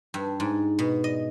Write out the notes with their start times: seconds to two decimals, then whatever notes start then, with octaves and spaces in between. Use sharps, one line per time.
0.14 G2
0.40 G#2
0.79 B2
1.04 D#5